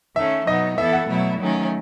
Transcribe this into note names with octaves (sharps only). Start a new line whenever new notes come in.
D#3 A3 C#4 E5
B2 F#3 B3 D#4 D#5
E3 B3 E4 A4 E5
F#5
B2 F#3 A3 E4
D#3 F#3 A3 C#4